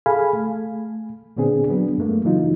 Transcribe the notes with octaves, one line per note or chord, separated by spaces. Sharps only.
G#4 A4 F5 G#5 B5
A3
A#2 D3 B3 C4 D4 G#4
F#3 B3 D4
G2 A3 A#3
C#3 E3 F#3 D#4 F4